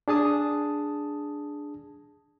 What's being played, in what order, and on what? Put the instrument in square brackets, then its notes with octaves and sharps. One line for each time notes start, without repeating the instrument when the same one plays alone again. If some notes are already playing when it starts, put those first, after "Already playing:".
[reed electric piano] D4 G#4 A5 D#6